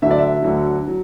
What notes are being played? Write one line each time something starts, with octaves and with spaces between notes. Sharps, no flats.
D2 D3 F#3 E5
D5
E5
D2 D3 F#3
F#3